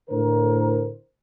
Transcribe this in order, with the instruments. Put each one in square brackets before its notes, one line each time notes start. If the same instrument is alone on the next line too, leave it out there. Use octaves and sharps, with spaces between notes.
[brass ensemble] A2 D3 A#4 C5